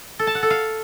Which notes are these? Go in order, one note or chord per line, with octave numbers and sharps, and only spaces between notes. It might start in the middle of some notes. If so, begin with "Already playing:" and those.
A4
A5
F#5
A4
F5